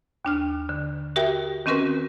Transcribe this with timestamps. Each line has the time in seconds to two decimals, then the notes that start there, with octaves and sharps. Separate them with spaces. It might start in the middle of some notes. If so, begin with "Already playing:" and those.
0.25 D#2 D4 F6
0.69 D3
1.16 F#4 G4 A#4 E5 G5
1.66 D#3 C4 C#4 F#4 A#4 B4